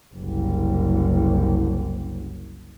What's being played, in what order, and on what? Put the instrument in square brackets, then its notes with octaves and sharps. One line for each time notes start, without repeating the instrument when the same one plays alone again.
[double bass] F#1 C2